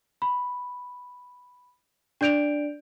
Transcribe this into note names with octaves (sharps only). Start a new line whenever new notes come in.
B5
D4 D5 G6 D7 F7